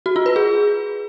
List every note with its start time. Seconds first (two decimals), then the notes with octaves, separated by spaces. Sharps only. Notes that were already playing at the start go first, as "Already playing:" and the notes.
0.06 F#4
0.16 F4
0.26 B4
0.36 G#4